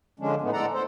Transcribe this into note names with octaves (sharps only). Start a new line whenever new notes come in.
D3 F3 G#3 C#4 D4
A2 D#3 G#3 A3 B3
A2 G#3 A4 D5 F#5 A#5
A4 C5